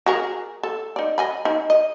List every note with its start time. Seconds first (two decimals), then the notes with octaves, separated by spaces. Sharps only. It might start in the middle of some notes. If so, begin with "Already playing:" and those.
0.06 F#4 G#4 A#4
0.63 A4
0.96 D#4 D5
1.18 D#5 G#5 B5
1.45 D#4
1.70 D#5